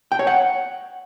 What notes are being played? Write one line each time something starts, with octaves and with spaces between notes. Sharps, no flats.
G5
C#5
F#5